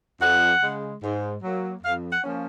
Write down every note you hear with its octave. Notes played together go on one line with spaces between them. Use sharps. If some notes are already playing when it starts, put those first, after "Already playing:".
F2 F#5
C#3 G#3
G#2
F#3 A#3
F2 F5
F#5
F3 A#3 C#4